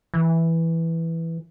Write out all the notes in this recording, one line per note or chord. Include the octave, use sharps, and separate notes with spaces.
E3